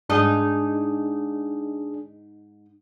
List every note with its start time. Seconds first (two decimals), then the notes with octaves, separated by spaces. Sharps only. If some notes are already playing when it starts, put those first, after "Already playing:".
0.10 G#2 D4 D#4 G#4 D#5